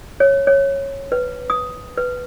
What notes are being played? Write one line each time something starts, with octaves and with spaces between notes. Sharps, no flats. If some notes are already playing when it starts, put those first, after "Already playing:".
C#5
C#5
B4
D#6
B4